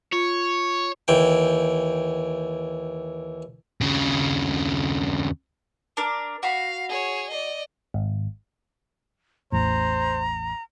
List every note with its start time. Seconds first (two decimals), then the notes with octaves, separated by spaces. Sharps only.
0.12 F4 C#5
1.08 D#2 E3 G5
3.81 D#2 C#3
5.97 D4 A#4
6.43 F#4 F5 B5
6.89 G#4 C#5
7.30 D5 D#5
7.94 G#1
9.52 A1 E2 A2 C5 A#5